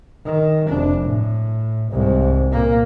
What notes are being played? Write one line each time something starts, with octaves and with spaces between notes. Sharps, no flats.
D#3
F1 D4
A2
C2 G#2
A#2 A#3